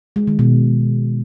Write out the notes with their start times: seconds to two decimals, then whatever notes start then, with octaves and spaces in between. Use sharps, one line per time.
0.16 G#3
0.27 D#3
0.39 B2